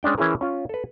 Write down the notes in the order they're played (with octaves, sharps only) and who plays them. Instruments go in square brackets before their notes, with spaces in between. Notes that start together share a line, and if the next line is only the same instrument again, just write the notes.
[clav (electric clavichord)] G#3 C#4 D4 G5
E3 C#4 E4 G#4 A#4
C#4 F4
A4 B4